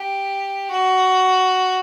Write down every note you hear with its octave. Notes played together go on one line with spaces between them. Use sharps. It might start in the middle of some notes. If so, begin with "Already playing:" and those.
Already playing: G4
F#4